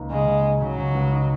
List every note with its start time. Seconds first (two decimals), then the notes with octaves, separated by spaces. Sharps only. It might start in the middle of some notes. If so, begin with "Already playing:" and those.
Already playing: C#2 A#3 D#4
0.11 C#3 G#3
0.27 C#3
0.44 D#4
0.61 C#3 F#3
0.78 C#3
0.94 C#2
1.12 D#4